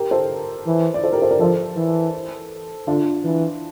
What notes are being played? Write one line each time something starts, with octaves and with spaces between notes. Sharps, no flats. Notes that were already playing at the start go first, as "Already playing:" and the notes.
Already playing: G4 A#4
A4 C5
E3
D5
A4 C5
G4 A#4
A4 C5
A#4 D5
F3 A4 C5
E3
D3 D4 F4
E3